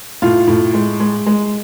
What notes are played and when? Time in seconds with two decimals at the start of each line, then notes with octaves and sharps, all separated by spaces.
0.22 A2 F4
0.47 A2
0.74 G#3
1.00 G#3
1.26 G#3